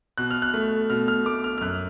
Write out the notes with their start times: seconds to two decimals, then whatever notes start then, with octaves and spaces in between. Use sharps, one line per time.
0.18 B2 F#6
0.31 F6
0.42 F#6
0.54 A3
0.90 B2 F6
1.08 F6
1.26 A3 D6
1.44 F6
1.58 F6
1.61 F#2 F#6